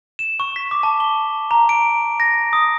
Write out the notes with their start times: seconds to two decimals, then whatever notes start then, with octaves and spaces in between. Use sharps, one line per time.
0.19 E7
0.40 C#6
0.56 B6
0.71 D6
0.83 A5
1.00 G7
1.51 A#5
1.69 D7
2.20 A#6
2.53 D#6